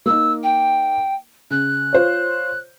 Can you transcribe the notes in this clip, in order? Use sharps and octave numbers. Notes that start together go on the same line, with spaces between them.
A#3 D#4 E6
G5
C#3 F#6
F4 C5 C#5